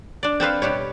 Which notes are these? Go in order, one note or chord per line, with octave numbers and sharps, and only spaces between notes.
D4 D5
C4 A4 B4 F5
B2 G3 G4 C#5